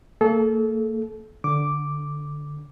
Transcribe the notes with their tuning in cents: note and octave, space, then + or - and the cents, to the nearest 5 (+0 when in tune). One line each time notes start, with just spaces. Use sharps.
A#3 -40 A4 -30
D3 +0 D6 +0